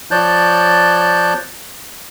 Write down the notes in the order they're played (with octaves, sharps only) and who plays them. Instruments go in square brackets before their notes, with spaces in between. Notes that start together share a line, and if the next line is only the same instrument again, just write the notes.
[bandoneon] F3 C#5 D5 A5 F#6 G6